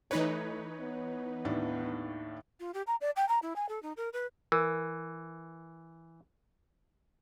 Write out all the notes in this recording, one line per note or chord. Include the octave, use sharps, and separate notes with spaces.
E3 A3 D#4 B4 C#5
B3
D#2 A2 D4
F4
G4
A#5
D5
G5
A#5
E4
G#5
A4
D#4
A#4
B4
E3 A#4